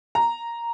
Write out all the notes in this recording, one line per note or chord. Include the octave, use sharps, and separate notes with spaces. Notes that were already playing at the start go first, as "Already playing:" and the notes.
A#5